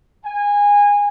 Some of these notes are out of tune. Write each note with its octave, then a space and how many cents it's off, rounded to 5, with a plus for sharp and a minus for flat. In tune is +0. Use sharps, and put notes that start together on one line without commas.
G#5 -20